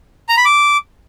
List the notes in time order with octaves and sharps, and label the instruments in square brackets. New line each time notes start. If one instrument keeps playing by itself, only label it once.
[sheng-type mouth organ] A#5
B5
D6